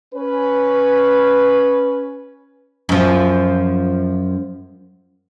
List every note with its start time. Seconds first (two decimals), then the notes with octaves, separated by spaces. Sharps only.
0.14 C#4 B4
2.89 F#2 F3